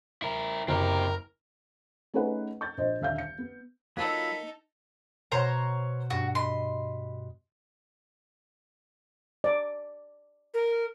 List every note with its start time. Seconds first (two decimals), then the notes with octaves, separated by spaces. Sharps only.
0.22 E4 A#4
0.68 F#1 C4 G4 A#4
2.14 A3 C#4 D#4 G#4 B4 F#5
2.61 C#6 G6 A6
2.78 A#1 C5 D#5
3.01 D#1 D3 E5 F5 G6
3.18 C#7
3.38 B3
3.97 F#3 A#3 D#4 F4 A4 B5 E6
5.32 B2 C5 C#5 F#5 A#5
6.10 G2 F#4
6.35 D#5 B5 C6
9.44 D5
10.54 A#4